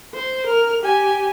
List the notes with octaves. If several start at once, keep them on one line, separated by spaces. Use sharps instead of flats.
C5
A#4 F6
G4 G#5